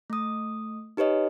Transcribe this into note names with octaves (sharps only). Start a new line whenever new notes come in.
A3 D#6
D#4 G4 B4 C#5 D#5